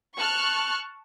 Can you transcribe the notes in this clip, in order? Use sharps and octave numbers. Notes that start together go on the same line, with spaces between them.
A5 C#6 F6 F#6